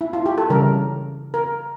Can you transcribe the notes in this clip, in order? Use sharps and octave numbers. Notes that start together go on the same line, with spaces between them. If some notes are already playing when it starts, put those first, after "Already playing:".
E4
F4
G4
A4
C#3 E3 G3 A#4
A#4